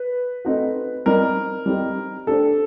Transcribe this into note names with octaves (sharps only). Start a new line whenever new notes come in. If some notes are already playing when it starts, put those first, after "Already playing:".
Already playing: B4
A3 C4 D#4 F#4
G3 C4 D#4 G4 A#4
G3 C4 D#4 G4
A3 D4 G4 A4 C5